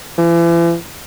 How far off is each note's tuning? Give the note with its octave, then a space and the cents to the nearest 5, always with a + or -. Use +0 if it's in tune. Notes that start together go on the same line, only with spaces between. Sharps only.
E3 +40